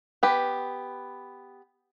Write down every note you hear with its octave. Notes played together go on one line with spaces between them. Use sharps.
B3 G4 B4